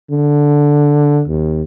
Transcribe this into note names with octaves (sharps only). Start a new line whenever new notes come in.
D3
D#2